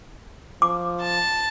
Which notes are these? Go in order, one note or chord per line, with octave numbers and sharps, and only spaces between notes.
F3 D6
A5